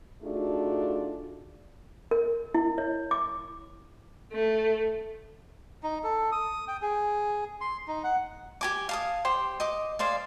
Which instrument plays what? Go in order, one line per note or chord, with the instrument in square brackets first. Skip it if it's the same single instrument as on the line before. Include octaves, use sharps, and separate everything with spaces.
[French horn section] A3 D4 D#4 F4 F#4 G#4
[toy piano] A#4
E4
C#5
D6
[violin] A3
[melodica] D#4
A4
D#6
G5
G#4
C6
D#4
F#5
[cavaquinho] G4 G#5 D6
F5 A5 D#6
G4 C5 G5
D#5 D6
G#4 C5 D5 F5